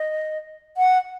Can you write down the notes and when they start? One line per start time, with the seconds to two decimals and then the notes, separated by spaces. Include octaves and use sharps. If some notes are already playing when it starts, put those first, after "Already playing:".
Already playing: D#5
0.77 F#5